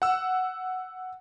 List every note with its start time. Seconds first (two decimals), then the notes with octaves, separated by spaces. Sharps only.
0.02 F#5 E6